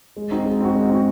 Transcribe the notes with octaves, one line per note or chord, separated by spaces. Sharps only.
G#3
C4 D#4 F#4
G#3
C4 D#4 F#4
G#3
C4 D#4 F#4